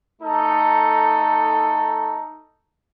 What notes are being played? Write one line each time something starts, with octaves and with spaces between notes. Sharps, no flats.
A3 D#4 A4